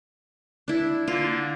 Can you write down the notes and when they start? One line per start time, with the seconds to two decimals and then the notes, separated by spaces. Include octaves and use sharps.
0.68 D4 E4
1.08 D3 A#3 F4